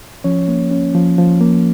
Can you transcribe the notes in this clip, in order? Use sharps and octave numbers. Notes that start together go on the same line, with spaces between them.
F3 C#4 C#5
A#3
C#4
F3
F3
A#3